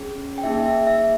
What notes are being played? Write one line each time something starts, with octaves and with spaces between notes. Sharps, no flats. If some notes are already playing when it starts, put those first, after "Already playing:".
Already playing: C#4 G#4
G5
A#3 D#4 G#4 E5
E5
E5